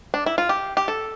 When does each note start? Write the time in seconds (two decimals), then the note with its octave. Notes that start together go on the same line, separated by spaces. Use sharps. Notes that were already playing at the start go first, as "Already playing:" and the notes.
0.14 D4
0.26 E4
0.38 F4
0.49 G4
0.77 G4
0.88 A4